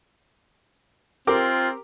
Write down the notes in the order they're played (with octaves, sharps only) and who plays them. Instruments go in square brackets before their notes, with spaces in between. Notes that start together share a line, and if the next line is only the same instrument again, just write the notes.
[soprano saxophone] C4 [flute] F4 [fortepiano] G4 A#4 D6